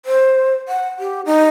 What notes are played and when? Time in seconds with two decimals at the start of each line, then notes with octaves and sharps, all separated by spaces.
0.06 C5
0.68 F#5
0.99 G4
1.26 D#4